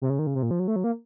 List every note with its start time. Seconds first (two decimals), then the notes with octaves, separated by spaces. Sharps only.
0.02 C3
0.10 C#3
0.19 D#3
0.27 C#3
0.35 C3
0.43 A#2
0.51 F3
0.59 F#3
0.68 A3
0.76 F#3
0.84 A#3